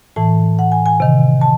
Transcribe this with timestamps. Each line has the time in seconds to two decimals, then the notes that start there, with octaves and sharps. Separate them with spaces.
0.16 A2 E3 A5
0.59 F#5
0.72 G#5
0.86 G#5
1.00 C3 D#3
1.41 A5